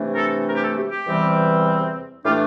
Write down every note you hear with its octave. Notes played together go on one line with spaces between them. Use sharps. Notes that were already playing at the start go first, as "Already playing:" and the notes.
Already playing: C3 E3 A3 D4
A#4
A4
A#4
G4
A4
G4
G4
E2 C3 E3 G3 C4
A2 E3 A3 D4 F4 G4